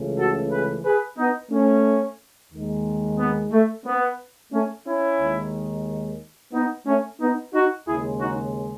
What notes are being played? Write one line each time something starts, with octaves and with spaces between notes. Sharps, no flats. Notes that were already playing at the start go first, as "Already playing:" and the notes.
Already playing: C#2 C#3 E3 A3
F#4 A4
G#4 B4
G#4 B4
B3 D#4
A3 C#4
D#2 D#3 G#3
B3
A3
B3
A3 C#4
C#4 E4
D#2 D#3 G#3
B3 D#4
A3 C#4
B3 D#4
D#4 F#4
D#2 C#3 G#3 E4 G#4
D#4 F#4